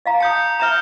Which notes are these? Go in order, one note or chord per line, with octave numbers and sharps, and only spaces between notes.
D#5 F5 A#5
A5 A#5 D#6 G6 C#7
E5 A#5 F6 G6 E7